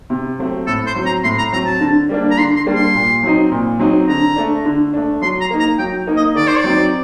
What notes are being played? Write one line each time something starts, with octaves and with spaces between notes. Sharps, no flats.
C3
F#3 A3 C4
A2 A4
C5
F#3 C4
A#5
A2 C6
A#5
F#3 C4 A#5
A5
D3
G3 A#3 D4
A#5
D3 C6
C6
G3 A#3 D4
C6
A#2
F#3 C4 D#4
A#2
F#3 C4 D#4
D3 A#5
A3 D4
D3
A3 D4
F#3 C6
A#5
A#3 D#4
A#5
F#3 G5
A#3 D#4
D#5
D#3 D5
C5
D5
F#3 C4 D#4